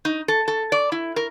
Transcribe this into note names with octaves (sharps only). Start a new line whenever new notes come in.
D#4
A4
A4
D5
E4
A#4